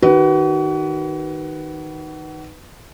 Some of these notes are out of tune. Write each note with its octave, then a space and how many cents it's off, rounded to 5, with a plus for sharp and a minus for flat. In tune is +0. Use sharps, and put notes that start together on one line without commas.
D#3 +0 F#4 +35 B4 +0